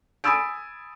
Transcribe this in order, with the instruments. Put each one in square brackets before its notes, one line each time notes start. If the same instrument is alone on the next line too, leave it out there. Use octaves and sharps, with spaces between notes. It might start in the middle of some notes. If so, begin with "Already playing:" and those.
[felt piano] G#5 B5 D#6 E6 A6 D7